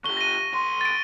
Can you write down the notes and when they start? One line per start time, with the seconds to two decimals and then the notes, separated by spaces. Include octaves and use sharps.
0.04 D3 G4 C#6 G7
0.17 A#6 D#7
0.52 B1 C6
0.81 A6 D7